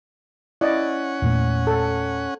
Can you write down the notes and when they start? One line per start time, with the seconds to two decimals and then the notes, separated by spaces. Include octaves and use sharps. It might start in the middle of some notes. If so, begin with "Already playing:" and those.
0.61 C#4 E4 D5 D#5 F#5
1.22 E2 A#2 A3
1.67 A4